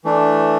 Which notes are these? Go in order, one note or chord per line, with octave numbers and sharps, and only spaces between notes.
E3 A3 D4